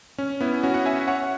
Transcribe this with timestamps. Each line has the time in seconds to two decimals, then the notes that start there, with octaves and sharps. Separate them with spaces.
0.18 C#4
0.41 B3 E4
0.63 C#4 F#4
0.74 F#5
0.86 E5 G#5
1.08 C#5 F#5